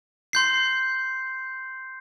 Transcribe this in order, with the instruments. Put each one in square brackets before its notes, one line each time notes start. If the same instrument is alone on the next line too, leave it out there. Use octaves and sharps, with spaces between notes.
[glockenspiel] C6 G6 C7